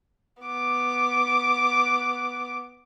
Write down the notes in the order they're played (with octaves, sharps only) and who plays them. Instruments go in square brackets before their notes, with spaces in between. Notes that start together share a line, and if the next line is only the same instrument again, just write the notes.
[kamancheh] B3 D6